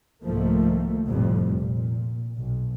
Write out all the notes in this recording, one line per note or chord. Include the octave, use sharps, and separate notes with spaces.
C2 G#2 D#3 F3 A3 A#3
F1 F2 A2 G3
A#2
B1